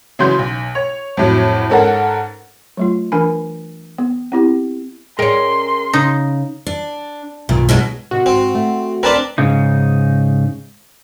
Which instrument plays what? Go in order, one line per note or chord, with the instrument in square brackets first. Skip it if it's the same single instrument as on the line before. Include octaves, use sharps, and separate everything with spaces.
[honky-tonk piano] C#3 E3 F#3 C#4 C6 G6
B1
C#5
F2 A2 F#3
G#2 C#4 A4 A#4 F#5
[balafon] F#3 A3 F4
E3 D4 A#4 G#5 B5
B3
C4 E4 G4
[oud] C#4 G#4 [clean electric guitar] A#4 D#5 G5 [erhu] C6
[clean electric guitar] C#3 [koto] D#4
[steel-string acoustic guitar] D4
[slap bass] B1 G2 D#3 [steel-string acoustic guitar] A#2
[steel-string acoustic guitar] B2 F#3 G#3
[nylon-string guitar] C3 D#3 [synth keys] F#4
[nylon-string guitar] G#2 [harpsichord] C4
[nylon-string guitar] A3
[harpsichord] C4 D4 [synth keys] A#4 B4 A5
[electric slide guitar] G#2 C#3 D#4